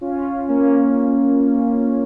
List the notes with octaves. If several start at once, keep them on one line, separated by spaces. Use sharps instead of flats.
C#4 F4
A#3 C#4